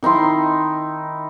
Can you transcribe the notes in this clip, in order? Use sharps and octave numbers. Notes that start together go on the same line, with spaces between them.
D#3 D#4 E4 C6